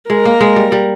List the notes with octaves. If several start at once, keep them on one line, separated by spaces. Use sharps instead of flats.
G#3 A#4
A#3
G#3
G3
G3